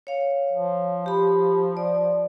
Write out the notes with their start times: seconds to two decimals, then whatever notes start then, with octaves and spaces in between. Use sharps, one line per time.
0.07 C#5 F5
0.53 F3
1.06 G4 B5
1.77 D5